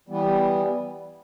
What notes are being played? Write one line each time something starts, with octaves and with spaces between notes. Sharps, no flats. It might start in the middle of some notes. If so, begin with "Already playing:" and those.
E3 G3 B3